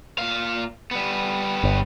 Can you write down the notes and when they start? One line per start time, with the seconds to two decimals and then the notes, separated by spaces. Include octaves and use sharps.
0.18 A#2 F5
0.91 G3 B3
1.64 G1